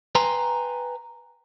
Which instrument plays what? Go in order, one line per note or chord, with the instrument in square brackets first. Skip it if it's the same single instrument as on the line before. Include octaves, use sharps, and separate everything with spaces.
[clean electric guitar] B4 G5 G#5 A#5 C6